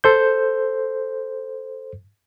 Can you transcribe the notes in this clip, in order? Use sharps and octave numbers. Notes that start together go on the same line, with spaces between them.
A4 C5 G6